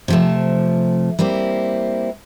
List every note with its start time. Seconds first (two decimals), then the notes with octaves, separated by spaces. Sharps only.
0.08 C3 F3 A3
1.19 G3 A#3 C4 E4